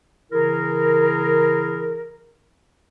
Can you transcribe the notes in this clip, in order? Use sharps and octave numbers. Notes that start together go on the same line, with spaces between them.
C#3 E3 E4 G#4 A#4